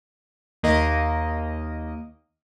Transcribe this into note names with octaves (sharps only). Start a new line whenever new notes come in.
D#2 A#3 D#5